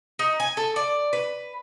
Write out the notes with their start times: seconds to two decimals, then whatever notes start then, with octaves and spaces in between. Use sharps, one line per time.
0.19 D#4
0.40 G#5
0.57 A4
0.76 D5
1.13 B4